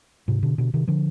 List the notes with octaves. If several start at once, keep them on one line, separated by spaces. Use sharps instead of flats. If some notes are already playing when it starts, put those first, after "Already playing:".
G#2 C3
B2 D3
B2 D3
C3 D#3
D3 F3